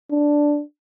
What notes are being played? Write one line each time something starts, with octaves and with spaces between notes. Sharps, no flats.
D4